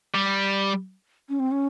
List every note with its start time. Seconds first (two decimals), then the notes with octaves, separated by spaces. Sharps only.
0.15 G3
1.29 C#4
1.39 C4
1.51 C#4